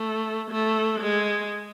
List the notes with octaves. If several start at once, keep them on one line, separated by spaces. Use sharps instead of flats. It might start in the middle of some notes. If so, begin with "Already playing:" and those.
Already playing: A3
A3
G#3